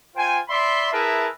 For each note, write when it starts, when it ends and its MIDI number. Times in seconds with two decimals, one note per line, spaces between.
0.16 0.39 65
0.16 0.39 72
0.16 0.39 79
0.16 0.39 80
0.48 0.88 74
0.48 0.88 76
0.48 0.88 83
0.48 0.88 84
0.92 1.28 64
0.92 1.28 68
0.92 1.28 70
0.92 1.28 71
0.92 1.28 76
0.92 1.28 81